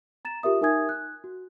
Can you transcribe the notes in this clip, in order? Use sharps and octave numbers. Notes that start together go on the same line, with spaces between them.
A#5 A6 E7
F4 G4 A#4 E5 D#6
D#4 A#4 E5 G#5 D#6 G#6
F#6
F#4